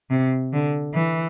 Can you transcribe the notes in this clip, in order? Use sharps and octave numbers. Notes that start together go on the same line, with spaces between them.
C3
D3
E3